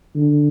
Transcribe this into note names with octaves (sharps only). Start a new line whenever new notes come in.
D3